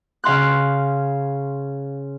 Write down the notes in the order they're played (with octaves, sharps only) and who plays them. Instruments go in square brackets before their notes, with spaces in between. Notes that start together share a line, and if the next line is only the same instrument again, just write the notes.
[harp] C#3 F5 C6 F#6